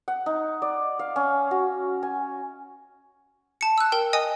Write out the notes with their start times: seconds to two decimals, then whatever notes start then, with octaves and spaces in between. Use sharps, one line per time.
0.08 F#5
0.26 D#4
0.62 D5
0.99 F5
1.16 C#4
1.51 F#4
2.03 G#5
3.61 A5 C#7
3.78 E6 F#6
3.92 A#4 G5
4.13 D#5 G#5 D#6